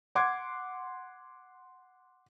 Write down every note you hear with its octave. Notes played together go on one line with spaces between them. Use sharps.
F#5 C6 D6 G#6